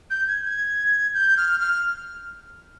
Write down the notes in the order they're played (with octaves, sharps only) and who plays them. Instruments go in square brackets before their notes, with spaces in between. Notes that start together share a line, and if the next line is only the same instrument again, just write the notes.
[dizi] G6
G#6
G#6
G6
F6
F6